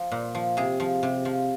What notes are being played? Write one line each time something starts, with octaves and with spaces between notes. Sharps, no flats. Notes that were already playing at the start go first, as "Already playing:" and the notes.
Already playing: F3
A#2
F3
C3 G#4
F3
C3
F3